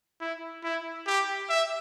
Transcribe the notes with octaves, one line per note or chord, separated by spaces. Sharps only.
E4
E4
G4
E5